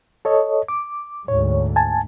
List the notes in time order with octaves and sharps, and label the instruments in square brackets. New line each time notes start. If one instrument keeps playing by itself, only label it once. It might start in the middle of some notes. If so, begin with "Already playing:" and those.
[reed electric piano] A4 C#5 D#5
D6
[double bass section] D2 G#2 [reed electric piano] C#5
[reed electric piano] G#5 A5